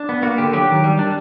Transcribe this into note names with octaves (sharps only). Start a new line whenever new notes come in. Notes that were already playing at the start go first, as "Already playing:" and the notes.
Already playing: D4
B3
A#3 F#4
D3 G4
F#3 G4
D#3
G3
D4